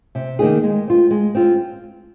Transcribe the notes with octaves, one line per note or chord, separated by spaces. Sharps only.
C3
D#3 A#3 D#4 G#4
G#3
C4 F4
G#3
C4 F4